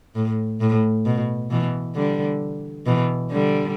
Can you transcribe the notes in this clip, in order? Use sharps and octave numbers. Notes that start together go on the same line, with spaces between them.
A2
A2
B2
B2 E3
D3 G3
B2 E3
D3 G3